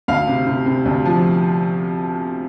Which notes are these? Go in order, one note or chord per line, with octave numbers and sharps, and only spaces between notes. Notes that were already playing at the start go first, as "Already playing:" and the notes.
D2 F5
C3
C3
C3
D2
F3